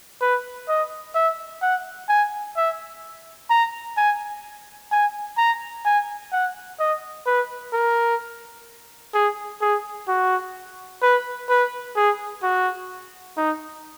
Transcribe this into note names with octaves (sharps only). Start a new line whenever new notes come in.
B4
D#5
E5
F#5
G#5
E5
A#5
G#5
G#5
A#5
G#5
F#5
D#5
B4
A#4
G#4
G#4
F#4
B4
B4
G#4
F#4
D#4